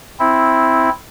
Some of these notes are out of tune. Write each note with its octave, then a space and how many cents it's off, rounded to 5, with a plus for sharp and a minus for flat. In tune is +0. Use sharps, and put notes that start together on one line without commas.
C4 +0 E4 -5